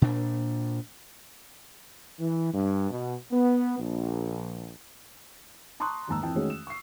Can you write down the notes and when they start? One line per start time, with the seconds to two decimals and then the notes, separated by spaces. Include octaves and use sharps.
0.02 A#2 D4
2.19 E3
2.53 G2
2.91 B2
3.31 B3
3.79 A#1
5.80 A5 A#5 C6 C#6 D#6 F#6
6.07 D#2 G#2 D#3 A5 A#5 E6
6.22 F2 E3 E4 G5 A5
6.35 D#3 G#3 A3 C#4 F#4 G#4
6.50 E7
6.67 C#6 C7